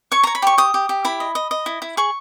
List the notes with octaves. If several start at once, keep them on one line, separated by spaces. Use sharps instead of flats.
C#5 C#6
C#5 A#5
B5
G4 C#6
G4 D#6
G4
G4
E4 B5
D#5
D#5
D#5
E4
E4
G#4 C#6